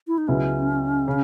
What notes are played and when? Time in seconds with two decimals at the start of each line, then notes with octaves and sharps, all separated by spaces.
0.08 E4
0.18 D#4
0.28 C#2 C#3 F#3 B3 C#4 E4
1.08 C#3